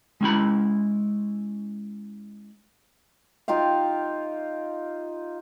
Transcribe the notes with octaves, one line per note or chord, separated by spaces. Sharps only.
G#3 C#4 E4 B5
D#4 F4 G4 F5